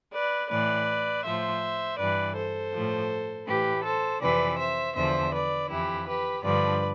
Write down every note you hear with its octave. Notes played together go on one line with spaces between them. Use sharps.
B4 D5
A2 E3 B4 D5
A2 F3 C5 E5
G2 E3 B4 D5
A4 C5
A2 F3
A2 E3 G4 B4
A4 C5
F2 C3 E3 B4 D5
C5 E5
E2 D3 F3 C5 E5
B4 D5
F2 E3 E4 G4
G4 B4
G2 D3 F3 B4 D5